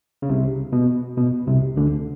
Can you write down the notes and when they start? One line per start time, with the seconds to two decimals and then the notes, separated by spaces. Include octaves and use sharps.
0.22 C#3
0.29 C2 C3
0.73 B2
1.17 B2
1.47 C2 C3
1.76 D2 D3